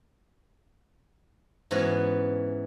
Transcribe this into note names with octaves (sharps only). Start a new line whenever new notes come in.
G#2 E3 B3 C#4 F#4